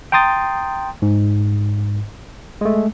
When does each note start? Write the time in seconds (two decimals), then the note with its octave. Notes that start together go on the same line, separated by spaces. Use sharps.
0.12 G5 A#5 C6 D#6 A6
1.02 G#2
2.61 G#3 A3